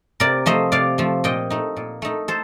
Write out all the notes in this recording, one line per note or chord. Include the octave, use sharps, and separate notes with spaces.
C3 A#4 D5
F3 A3 C5 D#5
C3 D5 F5
F3 A3
A#2 D#5 G5
A3 D#4
A#2
A3 D#4
A4 C5